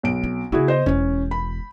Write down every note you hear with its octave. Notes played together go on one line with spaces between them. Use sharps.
B1 D7
C4
C#3 B3 E4 F#4 G#4
C5 D#5
E1 E3 C#4
B5